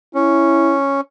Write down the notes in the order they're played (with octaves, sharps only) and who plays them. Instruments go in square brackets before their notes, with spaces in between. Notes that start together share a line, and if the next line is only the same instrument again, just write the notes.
[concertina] C#4 [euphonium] E4